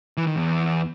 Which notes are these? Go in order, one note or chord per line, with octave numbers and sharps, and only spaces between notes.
E3
D#3
E2